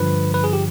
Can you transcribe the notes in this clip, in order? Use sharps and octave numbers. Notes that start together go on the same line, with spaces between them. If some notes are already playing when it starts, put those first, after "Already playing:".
Already playing: G2 D3 F3 B4
B4
G#4
G4